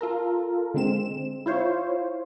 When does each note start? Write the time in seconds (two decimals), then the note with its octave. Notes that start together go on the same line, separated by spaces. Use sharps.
0.01 F4 A4 A#4
0.74 D3 G#3 C4 E7
1.46 E4 F4 C5 C#5